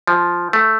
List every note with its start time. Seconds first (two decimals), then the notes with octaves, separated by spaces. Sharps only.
0.07 F3
0.53 A3